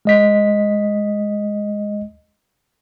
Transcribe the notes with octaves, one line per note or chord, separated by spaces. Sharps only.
G#3 D#5 B6